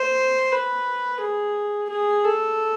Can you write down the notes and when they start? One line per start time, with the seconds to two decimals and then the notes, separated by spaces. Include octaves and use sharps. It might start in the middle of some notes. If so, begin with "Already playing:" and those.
Already playing: C5
0.52 B4
1.21 G#4
1.89 G#4
2.25 A4